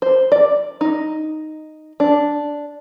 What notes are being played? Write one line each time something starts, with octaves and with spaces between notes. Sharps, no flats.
C5
D5
D#4
D4